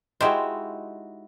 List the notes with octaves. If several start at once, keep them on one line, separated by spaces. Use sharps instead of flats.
G#3 D#4 E4 F#4 G4 C5